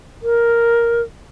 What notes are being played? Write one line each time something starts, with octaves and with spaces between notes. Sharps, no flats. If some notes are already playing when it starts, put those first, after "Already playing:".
A#4